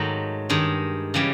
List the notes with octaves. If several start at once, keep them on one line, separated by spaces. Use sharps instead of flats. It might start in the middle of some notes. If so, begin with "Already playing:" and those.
Already playing: G#2 D#3 F#3 A3
G2 D#3 G#3
C#3 E3 G3